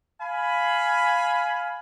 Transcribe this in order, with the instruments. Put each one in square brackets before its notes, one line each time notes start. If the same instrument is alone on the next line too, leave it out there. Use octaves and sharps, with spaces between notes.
[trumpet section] F5 G#5 B5